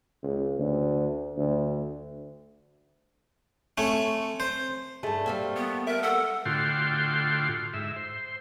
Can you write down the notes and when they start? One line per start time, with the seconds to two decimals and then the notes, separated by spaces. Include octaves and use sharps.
0.23 C#2
0.59 D2
1.37 D2
3.78 A3 C4 C#4
4.40 C5
5.03 G2 A3 G#4
5.26 G3 A#3 C4
5.56 B3
5.87 A#4 E5
6.03 A4 F#5
6.45 A2 D3 F4 F#4 G5 C6
7.74 G#2 E5
7.96 C5